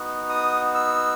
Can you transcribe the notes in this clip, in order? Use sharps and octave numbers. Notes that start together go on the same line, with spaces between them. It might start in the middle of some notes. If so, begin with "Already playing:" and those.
Already playing: B3 D#4 F#4
D#6
E6